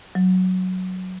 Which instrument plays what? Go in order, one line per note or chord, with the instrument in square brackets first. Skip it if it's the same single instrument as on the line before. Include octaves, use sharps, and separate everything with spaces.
[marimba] F#3